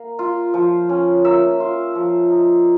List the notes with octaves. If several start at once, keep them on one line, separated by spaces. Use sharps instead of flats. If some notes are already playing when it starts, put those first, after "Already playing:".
Already playing: A#3
F4
F3
C#4
A#3 E5
F4
F3
D#4